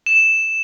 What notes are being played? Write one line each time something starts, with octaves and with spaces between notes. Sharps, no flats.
E7